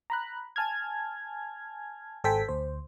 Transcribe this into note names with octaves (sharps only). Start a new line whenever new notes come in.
A#5 B5 F#6
G#5 A5 F6 G#6
G#1 A4 C5 G5 G#5 B6
D2 C5